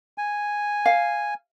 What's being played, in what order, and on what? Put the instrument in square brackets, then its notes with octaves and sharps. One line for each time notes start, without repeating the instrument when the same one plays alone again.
[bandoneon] G#5
[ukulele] F5